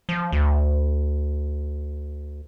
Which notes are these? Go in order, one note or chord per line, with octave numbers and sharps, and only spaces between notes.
F3
D2